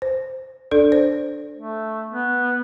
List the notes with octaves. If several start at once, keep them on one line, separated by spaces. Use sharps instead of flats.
C5
D4 A4 D5
C5
A3
B3